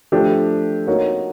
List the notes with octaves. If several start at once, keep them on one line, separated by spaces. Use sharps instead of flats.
F3 A3 D4 G4
A#3 D#4 F#4 A#4 C#5